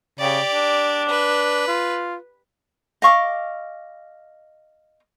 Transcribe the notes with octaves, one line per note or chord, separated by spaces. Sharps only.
C#3 G4 D5
D4
B4
F4
D#5 F5 C#6 D6